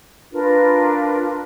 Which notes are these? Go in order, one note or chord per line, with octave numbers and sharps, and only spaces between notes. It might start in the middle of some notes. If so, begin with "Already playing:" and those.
D4 F4 A#4 B4